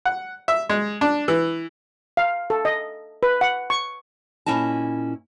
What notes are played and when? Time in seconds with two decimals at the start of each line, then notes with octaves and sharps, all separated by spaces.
0.05 F#5
0.48 E5
0.69 G#3
1.01 D4
1.28 E3
2.17 F5
2.50 A4
2.65 D#5
3.23 B4
3.41 F#5
3.70 C#6
4.46 A#2 D#3 C#4 E4 D#5 A5